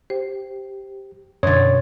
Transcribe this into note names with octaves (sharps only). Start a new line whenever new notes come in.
G4 C5
F#2 B2 D3 C#5 C6 G#6 A6